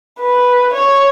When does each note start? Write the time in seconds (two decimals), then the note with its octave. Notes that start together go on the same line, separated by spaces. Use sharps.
0.20 B4
0.74 C#5